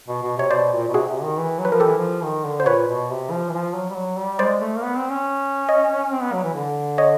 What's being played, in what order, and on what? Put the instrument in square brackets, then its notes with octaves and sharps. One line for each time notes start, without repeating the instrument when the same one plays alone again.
[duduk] B2
B2
[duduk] C3 [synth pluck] C#5
[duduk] B2 [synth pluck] C5 D5
[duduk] A#2
B2
[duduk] C3 [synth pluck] F#4 G#4
[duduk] C3
D#3
E3
F#3
[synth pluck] B4
[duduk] F3 [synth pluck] A#4
[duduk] E3 [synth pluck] G4 A4
[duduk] F3
D#3
D3
[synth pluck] C5
[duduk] A#2 [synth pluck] B4 C#5
[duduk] B2
C3
F3
E3
F3
F#3
G3
F#3
G3
[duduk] G#3 [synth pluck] C5 D5
[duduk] A3
A#3
B3
C4
C#4
[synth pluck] C#5 D#5
[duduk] C4
B3
F#3
E3
D3
[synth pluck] C#5 D#5